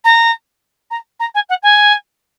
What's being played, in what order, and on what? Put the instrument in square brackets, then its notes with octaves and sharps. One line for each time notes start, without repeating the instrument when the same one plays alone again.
[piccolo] A#5
A#5
A#5
G#5
F#5
G#5